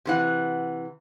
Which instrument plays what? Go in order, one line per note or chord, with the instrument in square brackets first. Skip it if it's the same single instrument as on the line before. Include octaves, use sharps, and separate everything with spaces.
[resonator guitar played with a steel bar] C3 E3 F#5